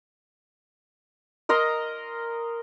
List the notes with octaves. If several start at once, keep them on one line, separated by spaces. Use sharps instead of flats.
A#4 D#5 A#5 C6